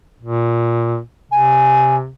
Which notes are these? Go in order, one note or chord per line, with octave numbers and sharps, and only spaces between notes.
A#2
C3 G#5